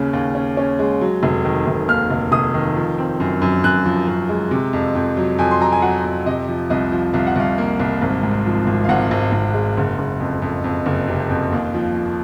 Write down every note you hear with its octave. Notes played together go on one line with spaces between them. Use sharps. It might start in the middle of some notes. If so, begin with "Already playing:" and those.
Already playing: D#2 C#3 C#4
D#2
C#4
C#4
G#3
F#3
F1
D#3
F1
D#2 F6
F1
F1 D#6
D#3
F3
C4
F#2
F#2
F#2 F#6
F3
F#2
G#3
C3
F2
F2
F#3
F2 G#5
C6
F#3 A#5
G#5
F#3 F#5
F2
C3 D#5
F3
C2 D#5
F3
C2 F5
F#5
C2 F5
A#3
C2
G#1
G#2
F3
G#1
F5
G#1 F#5
G#1
G#1
G#3
F#1
F#1
F2
F2
F2
F#1
C3
F2
D#2
F3
F3